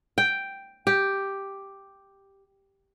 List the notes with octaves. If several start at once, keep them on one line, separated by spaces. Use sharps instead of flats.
G5
G4